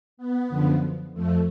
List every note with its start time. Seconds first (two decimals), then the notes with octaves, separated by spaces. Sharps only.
0.17 B3
0.49 F#2 D3 F3
1.14 F2 F3 A3